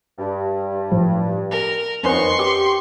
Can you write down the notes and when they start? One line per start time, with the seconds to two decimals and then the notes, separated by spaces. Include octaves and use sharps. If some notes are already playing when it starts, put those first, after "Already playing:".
0.19 G2
0.92 A2 F3
1.51 A#4
2.03 F2 D#3 F3 B3 C#4 B4 C6 C#6
2.39 G4 D6